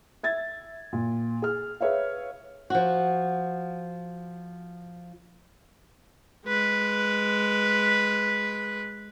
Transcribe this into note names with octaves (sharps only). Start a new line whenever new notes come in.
E5 G#6 A6
A#2
G#4 F6
G#4 B4 C#5 E5 F5
F3 F#4
G#3 B4